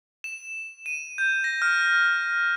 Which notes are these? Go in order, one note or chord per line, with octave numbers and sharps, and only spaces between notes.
E7
D#7
G6
A#6
F6